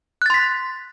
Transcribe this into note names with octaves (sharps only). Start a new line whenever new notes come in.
C6 F#6 A6 B6